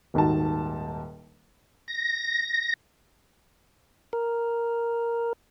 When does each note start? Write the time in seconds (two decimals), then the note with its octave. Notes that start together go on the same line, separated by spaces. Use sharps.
0.14 D#1 G#2 D#3 F#4 A5
1.88 A#6
4.13 A#4